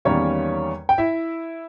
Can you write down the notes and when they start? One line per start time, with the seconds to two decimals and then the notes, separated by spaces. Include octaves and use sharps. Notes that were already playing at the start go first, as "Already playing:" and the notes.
0.05 E2 D#3 G3 A#3 C#4 C#5
0.89 G5
0.98 E4 E5